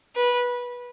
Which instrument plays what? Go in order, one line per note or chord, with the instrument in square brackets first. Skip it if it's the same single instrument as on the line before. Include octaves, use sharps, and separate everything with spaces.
[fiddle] B4